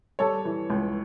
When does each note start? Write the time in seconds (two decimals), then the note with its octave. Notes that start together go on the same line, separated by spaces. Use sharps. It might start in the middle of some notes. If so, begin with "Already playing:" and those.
0.19 G3 A4 C#5
0.45 E3
0.70 C#2